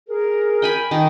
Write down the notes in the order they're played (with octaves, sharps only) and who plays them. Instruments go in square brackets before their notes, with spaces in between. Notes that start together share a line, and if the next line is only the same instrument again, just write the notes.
[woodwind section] G#4 A#4
[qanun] G5 G#5 B5
D#3 A#4